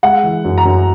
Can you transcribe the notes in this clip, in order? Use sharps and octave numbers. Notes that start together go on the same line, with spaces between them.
G#3 F#5
E3
F#2
A#5
F#2